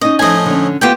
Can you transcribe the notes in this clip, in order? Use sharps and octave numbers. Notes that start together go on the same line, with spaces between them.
C#4 D#4 D#5
A2 F3 A3 D#5 G#5
D3 C#4
A3 B3 F4 G4 C5 G5